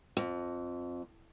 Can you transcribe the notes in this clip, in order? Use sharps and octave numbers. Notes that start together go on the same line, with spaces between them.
F2